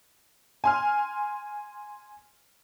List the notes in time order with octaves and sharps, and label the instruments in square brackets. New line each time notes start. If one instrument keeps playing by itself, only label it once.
[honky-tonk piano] G#5 C6 F6